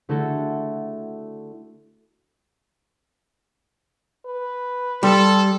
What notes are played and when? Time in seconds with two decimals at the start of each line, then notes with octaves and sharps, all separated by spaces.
0.09 D3 A3 E4 F#4 A4
4.26 B4
5.03 G3 A4 G5 C6